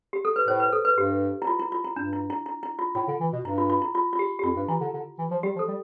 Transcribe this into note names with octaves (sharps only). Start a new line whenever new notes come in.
G4
A4
B4
A2 C5
B4
A4
B4
G2 G4
E4
F4
E4
F4
E4
G2 D4
E4
E4
E4
E4
F4
A2 F4
D3
E3
B2
G2 E4
F4
F4
E4
F4
F4
G4
G4
F2 F4
G2
E3 E4
D3
D3
E3
F3
G3 G4
F3
A4
G3